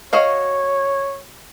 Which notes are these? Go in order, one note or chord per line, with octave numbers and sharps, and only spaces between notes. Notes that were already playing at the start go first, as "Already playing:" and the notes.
F#4 C#5 D#5 F5